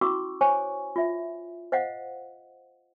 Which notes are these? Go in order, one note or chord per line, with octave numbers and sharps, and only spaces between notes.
C#4 E4 F#4 C#6 D6 E6
C5 C#5 G#5 C#6
F4 E5
C5 D#5 F5 F#5